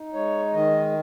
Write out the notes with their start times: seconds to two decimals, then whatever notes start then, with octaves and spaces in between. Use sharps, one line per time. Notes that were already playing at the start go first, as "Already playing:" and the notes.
Already playing: D#4
0.13 G#3 C#5
0.53 D#3 D#5